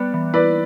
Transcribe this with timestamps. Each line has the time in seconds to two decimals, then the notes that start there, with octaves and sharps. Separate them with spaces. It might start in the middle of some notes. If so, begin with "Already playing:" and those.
Already playing: G3 B3 B4 D5
0.14 E3
0.34 E4 B4 D5